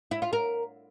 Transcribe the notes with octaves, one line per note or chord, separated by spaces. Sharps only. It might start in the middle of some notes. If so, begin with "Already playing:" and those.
E4
F4
A#4